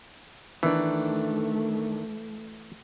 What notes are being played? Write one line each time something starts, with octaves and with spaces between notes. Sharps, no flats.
D#3 E3 A3 D4